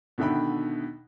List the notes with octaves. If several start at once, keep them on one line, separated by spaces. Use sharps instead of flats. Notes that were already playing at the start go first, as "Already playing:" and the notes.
B2 D3 D#3 E5 G5 B5